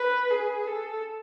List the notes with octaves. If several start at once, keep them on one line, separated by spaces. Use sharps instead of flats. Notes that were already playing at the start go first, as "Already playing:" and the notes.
Already playing: B4
G#4
A4